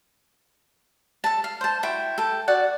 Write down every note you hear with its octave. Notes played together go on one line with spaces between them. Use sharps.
A4 A5
F5
C5 A5
E4 F#4 G5
A4 G5
F#4 D5 F#5